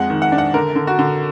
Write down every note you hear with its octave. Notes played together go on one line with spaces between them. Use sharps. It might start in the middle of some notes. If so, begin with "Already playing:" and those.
Already playing: F2 G#3 F#5
D#3
F#5
D4
F#5
D3 A#4
D3
F#4
D3